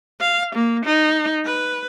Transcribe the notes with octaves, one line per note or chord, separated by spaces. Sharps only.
F5
A#3
D#4
B4